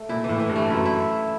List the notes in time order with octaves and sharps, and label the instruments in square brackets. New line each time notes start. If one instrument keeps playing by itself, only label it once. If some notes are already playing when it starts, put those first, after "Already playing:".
Already playing: [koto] A3
[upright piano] A#2 [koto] E4
[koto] E3
[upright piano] A2
[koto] E3
[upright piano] G2
[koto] A3
[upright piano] F#2 [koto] E4
[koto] E4